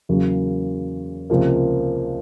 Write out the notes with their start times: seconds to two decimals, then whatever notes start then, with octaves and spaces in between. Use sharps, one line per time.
0.09 E2 C#3 F#3 A#3
1.30 C#2 C3 F3 A#3